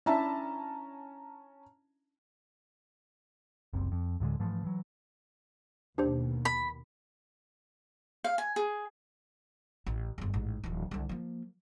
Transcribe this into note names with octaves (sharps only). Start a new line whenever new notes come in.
C#4 D4 E4 E5 A5 A#5
F#1 C2 C3
F2
D2 A2 D3 G#3
G#2 E3 F3 A3
E3 F#3
D#2 B2 D4 G4 C5
B5
F5
G#5
G#4
A1
G1 E2
A1 G#2
D1 E3
C2 D3
F3 A#3